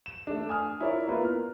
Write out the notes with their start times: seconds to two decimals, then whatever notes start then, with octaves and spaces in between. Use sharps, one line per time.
0.06 E7
0.27 A3 D4
0.49 G#5 D#6 F6
0.80 D4 E4 F4 A#4 C#5 D5
1.07 A#3 B3 E4 F4 B4
1.25 F6